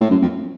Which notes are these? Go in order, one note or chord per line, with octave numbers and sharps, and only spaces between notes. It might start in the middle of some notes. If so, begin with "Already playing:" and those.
A2
F#2
F2